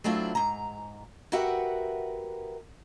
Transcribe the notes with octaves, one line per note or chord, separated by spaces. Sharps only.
F#3 A3 C4 D4 E4 F4
G#2 A#5
F#4 G4 A#4 B4 E5 F#5